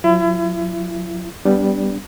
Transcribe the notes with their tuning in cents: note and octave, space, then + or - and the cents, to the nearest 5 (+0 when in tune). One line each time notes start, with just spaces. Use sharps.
F#3 -35 E4 +35
G3 +0 B3 +0 D4 -25